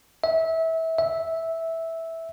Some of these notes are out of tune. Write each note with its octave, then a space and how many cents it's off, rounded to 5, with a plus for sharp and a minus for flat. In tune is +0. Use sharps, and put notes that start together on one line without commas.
E5 -25
E5 -10